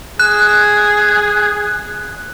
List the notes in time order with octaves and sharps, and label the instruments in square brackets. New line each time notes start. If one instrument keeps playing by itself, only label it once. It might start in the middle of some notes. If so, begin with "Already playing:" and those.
[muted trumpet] G#4 [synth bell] F#6